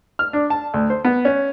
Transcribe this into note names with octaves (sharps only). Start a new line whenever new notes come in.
F6
D4
A5
D2
C5
B3
C#4